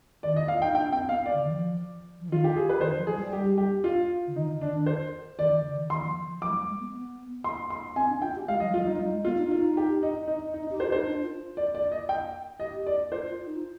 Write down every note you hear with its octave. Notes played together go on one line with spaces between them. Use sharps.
D#3 D5
D#5
F5
F4
D#4 G5
D4 G5
C4 G5
B3 F5
D5
D3
D#3
F3
F3
D#3 F4
G4
G#4
B4
D#3 C5
F3
G#4
G3
G4
G4
F4
D3
D#3 D#4
D3
D4
D#3
C5
D#3 D5
D#3
D3
D#3
D#3 C6
D#3
F3
D#3
F3
F3 D6
G#3
G3
G#3
B3
B3
C6
C6
C4 G#5
D4
F4 G5
G4
G#3 F5
F3 D#5
G3
F4
F3
G3
D#4
G3 D#4
G#3
B3 F4
D#4
D#4 F4
G4
D#4
D#4
D#4
D#4
G4
C5
F4
D#4 C5
D4
F4
D5
D5
D#5
G5
G4 D#5
D5
F4 C5
F4
D#4
F4